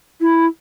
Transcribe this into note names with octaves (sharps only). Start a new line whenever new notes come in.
E4